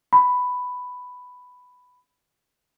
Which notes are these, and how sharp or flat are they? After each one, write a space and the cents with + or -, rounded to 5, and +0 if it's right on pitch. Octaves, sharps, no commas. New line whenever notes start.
B5 +5